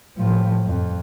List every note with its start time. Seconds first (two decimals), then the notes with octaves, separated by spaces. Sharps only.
0.17 A2 F3
0.65 F2